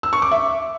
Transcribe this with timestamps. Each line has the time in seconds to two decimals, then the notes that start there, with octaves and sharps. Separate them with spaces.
0.03 E6
0.13 C#6
0.22 D6
0.31 E5